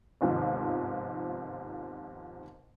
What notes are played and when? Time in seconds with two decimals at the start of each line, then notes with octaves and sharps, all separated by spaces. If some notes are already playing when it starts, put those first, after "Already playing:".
0.21 G1 D#2 G#2 C3 D#3 F3